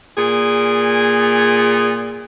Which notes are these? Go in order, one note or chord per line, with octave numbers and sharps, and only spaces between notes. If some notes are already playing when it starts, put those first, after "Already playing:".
A#2 G#4